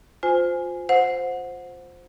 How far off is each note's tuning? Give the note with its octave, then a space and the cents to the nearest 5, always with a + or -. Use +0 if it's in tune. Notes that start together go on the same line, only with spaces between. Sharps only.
F4 +25 C5 -20 G#5 +0
C5 +0 F#5 -25